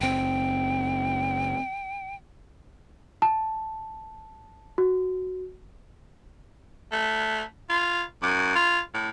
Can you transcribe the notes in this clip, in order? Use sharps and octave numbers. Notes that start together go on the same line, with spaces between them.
F#1 C4 G5
A5
F#4
A3
F4
F#2
F4
A2